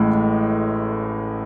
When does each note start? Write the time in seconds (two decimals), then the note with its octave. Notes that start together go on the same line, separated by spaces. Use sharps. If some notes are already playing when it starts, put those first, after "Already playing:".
Already playing: A1 A2 G#3